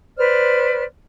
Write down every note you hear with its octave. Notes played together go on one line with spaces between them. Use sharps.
B4 C5 D5 F6